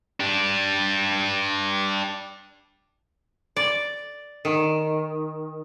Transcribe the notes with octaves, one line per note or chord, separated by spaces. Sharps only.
D4 G4
D5
D#3